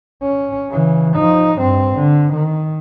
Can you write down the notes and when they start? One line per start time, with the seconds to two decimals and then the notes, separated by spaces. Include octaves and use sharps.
0.23 C#4
0.70 C#3 E3
1.17 F3 D#4
1.58 G2 C4
1.95 D3
2.33 D#3